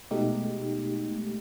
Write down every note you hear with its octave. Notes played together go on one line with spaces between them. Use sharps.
B2 G#3 A3 D#4 G4